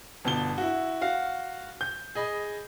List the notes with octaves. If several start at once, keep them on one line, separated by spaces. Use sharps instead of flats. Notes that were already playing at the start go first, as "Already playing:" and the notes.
G1 B2 A5 G7
E4 F#4
F#4 F5
G6
G#4 D#5 B5